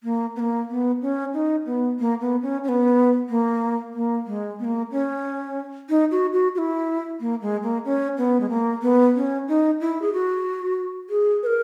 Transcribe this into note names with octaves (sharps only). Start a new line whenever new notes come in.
A#3
B3
A#3
B3
C#4
D#4
B3
A#3
B3
C#4
C#4
B3
A#3
A#3
G#3
B3
A#3
C#4
D#4
F#4
F#4
F#4
E4
A#3
G#3
A#3
C#4
B3
G#3
A#3
B3
C#4
D#4
E4
G#4
F#4
G#4
B4
A#4